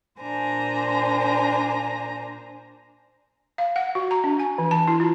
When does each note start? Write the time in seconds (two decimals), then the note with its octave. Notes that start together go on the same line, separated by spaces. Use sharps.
0.20 A#2 D4 C5 G#5 A#5
3.58 F5
3.76 F#5
3.95 F#4
4.11 A#5
4.24 D4
4.39 G#5
4.58 E3
4.71 A5
4.88 E4
5.00 F4